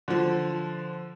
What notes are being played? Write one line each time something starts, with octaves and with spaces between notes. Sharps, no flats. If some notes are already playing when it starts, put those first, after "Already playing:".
D3 F3